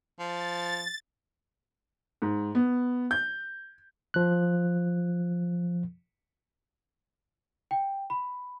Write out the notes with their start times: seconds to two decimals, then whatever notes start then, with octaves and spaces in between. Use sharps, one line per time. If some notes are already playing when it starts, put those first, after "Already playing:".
0.19 F3 A6
2.22 G#2
2.55 B3
3.11 G6
4.14 F3 F#6
7.71 G5
8.10 B5